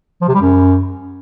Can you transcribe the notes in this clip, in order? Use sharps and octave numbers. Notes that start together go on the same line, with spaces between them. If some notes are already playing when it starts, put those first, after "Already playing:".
F3
C3
G3
F#2